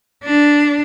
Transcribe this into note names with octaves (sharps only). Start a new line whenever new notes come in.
D4